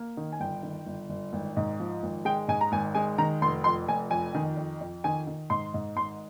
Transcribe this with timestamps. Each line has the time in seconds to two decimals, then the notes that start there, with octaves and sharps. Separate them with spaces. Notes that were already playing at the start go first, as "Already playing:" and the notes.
Already playing: A#3
0.17 D#3
0.32 G#5
0.40 G1 G5
0.63 D#3
0.86 G1
1.10 G1
1.33 G#1
1.57 G#2
1.80 F3
2.03 G#1
2.25 G#3 G5
2.48 G#2 G#5
2.61 A#5
2.72 G#1 G#5
2.95 G#3 G#5
3.18 D#3 A#5
3.41 F1 C6
3.64 F2 C6
3.88 F1 G#5
4.11 F2 G#5
4.35 D#3
4.57 F2
4.81 F2
5.04 D#3 G#5
5.27 D#3
5.50 G#2 C6
5.74 G#2
5.96 G#1 C6